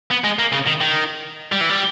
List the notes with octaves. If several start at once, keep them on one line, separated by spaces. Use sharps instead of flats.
B3
G#3
A#3
C#3
D#3
D#3
G3
E3
G3